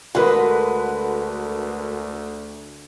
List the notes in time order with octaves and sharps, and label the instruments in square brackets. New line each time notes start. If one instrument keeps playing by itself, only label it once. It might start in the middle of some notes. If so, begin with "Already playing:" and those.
[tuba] D2 [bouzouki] D3 G#3 [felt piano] F#4 A#4 B4